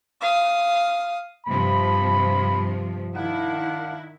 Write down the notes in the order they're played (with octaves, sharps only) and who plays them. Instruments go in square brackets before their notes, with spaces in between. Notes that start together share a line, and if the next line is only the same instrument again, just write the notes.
[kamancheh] F5 D#6
[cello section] G2 C3 F3 [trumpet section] B5
[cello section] D#3 E4 [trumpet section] D4 F5 F#5